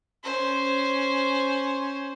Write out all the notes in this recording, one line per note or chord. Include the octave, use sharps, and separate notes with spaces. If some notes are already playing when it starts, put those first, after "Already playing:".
C#4 C5